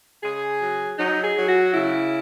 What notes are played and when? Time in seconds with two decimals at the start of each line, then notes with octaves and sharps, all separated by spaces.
0.23 C#3 G#4
0.61 F#3
0.98 F#3 D#4
1.24 G#4
1.36 F#3
1.49 F#4
1.74 C#3 E4